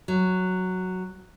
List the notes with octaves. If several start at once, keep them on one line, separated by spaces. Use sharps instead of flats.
F#3